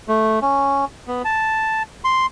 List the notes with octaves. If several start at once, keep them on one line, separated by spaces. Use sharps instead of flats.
A3
C#4
B3
A5
C6